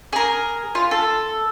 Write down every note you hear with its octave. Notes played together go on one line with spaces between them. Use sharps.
G#4 A#4
F4
A4